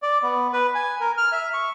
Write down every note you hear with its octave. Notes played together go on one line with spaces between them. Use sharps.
D5
B3
B4
G#5
A#4
F6
E5
C#6